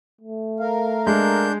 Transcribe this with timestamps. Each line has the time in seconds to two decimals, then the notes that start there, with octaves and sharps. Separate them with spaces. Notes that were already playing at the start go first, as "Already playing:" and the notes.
0.21 A3
0.60 A#4 F5
1.07 G#3 D4 G6